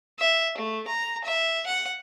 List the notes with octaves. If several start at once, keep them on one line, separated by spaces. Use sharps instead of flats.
E5
A3
A#5
E5
F#5